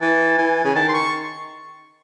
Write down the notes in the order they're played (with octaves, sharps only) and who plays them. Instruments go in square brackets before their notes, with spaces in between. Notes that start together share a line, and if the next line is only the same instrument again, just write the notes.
[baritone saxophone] E3 [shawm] A5
[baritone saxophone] E3 [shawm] G#5
[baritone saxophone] C#3
[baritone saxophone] D#3 [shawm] A5
[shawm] C6
C#6